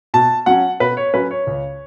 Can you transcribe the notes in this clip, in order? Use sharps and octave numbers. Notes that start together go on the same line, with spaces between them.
B2 A5
F#3 C#4 F#5
B2 B4
C#5
F#3 C#4 B4
C#5
C#2